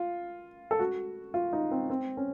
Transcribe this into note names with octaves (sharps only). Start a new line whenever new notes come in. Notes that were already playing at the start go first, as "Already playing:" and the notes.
Already playing: F4
A4
F#4
F4
D#4
C4
C4
C#4